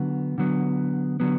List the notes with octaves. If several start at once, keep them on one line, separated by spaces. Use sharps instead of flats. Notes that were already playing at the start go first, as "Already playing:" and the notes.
Already playing: D3 F#3 B3
D3 F#3 B3
D3 F#3 B3